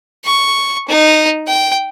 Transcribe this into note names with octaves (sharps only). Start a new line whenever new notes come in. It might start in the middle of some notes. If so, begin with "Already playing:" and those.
C#6
D#4
G5